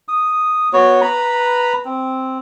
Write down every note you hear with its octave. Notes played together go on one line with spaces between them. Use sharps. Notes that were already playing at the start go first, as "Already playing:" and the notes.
D#6
B3 F#4 C#5
B4 A#5 B5
C4